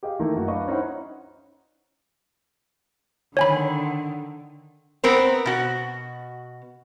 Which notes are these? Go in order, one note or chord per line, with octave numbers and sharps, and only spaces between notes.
G4 G#4 D#5 F5
D#3 E3 A3 A#3
F#2 F#4
D4 B4 D5 D#5 F5 C#6
C#4 D#4 E4 C5 F#5
D3 D#3 C#5 G#5 B5
B3 C4 A#4 C5
B2 F#4